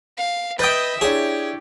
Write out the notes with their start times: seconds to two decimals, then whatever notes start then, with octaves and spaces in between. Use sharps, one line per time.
0.18 F5
0.59 B4 D#5 E5 G5 D#6 G6 A6
1.01 D4 E4 G4 G#4 C#5